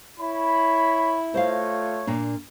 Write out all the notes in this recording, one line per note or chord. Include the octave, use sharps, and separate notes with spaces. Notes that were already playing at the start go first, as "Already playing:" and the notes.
E4 C#5 B5
A3 F4 C5 C#5 D#5 F5
A#2 A#3 D4